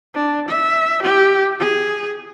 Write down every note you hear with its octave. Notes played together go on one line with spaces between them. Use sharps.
D4
E5
G4
G#4